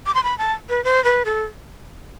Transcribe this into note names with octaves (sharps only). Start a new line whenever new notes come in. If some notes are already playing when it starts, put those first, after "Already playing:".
D6
C6
B5
A5
B4
C5
B4
A4